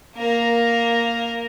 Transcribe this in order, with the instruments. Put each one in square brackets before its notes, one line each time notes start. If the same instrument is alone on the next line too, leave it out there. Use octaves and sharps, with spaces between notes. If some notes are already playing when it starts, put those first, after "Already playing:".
[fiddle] A#3 A#4